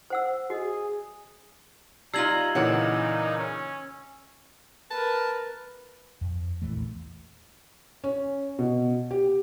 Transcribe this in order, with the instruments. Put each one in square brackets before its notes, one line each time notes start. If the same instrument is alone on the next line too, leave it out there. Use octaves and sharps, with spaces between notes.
[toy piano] C5 F#5 E6
[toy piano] F#4 D#5 [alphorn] G#4
[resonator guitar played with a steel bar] G3 D#4 F4 [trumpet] A#5 [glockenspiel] E6 G#6 F#7 [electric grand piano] C7
[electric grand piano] A#2 C#3 E3 [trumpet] D#4 [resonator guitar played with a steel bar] C#5 F#5
[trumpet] C#4
[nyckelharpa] A#4 B4 [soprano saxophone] A5
[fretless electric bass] F2
A#1 E2 E3 A3
[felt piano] C#4
B2
G4